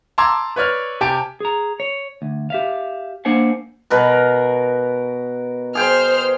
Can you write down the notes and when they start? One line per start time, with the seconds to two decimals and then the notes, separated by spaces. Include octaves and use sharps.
0.18 A5 A#5 C6 D6 E6 G#6
0.56 B4 C#5 D5 F6
1.01 C3 G4 G#5 A5 D7
1.40 G#4 A#5
1.80 C#5
2.22 D2
2.50 G4 E5 F5
3.25 A#3 D4 C5 F#5 G#5
3.90 B2 A#4 B4
5.75 G#4 C5 G5 F6